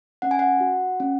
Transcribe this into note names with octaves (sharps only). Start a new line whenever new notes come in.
C#4 F#5
G#5
F#5
F#4
C#4